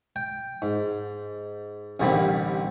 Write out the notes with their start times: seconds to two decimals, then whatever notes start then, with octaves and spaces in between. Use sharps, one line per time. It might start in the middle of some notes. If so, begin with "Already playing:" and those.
0.16 G5
0.62 G#2
2.00 A1 D#2 D3 G3 C4 B5